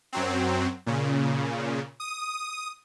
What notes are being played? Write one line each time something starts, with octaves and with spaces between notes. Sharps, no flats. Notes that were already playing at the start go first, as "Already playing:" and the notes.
F#2 F#3 C4
A#2 C#3
D#6